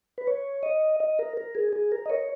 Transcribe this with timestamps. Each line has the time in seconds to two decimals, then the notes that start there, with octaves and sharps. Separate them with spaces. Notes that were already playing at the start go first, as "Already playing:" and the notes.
0.18 B4
0.27 C#5
0.63 D#5
1.00 D#5
1.19 A#4
1.37 A#4
1.55 G#4
1.73 G#4
1.92 A#4
2.06 D#5
2.10 C#5